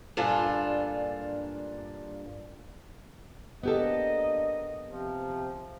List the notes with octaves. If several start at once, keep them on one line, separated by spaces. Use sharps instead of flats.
G2 A#2 D4 F4 A4 G#5
A#3 B3 D4 G4 A4 D#5
C3 F3